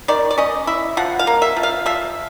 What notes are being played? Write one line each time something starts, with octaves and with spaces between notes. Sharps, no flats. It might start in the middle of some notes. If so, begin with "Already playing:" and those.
D#3 D5
D5
C#4 D#5
E4 E5
F3 F#5
F5
A#3
E5
F3
F5
F3 E5